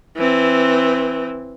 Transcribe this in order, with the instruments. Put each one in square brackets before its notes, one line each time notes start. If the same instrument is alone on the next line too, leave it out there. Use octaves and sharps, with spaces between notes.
[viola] E3 C4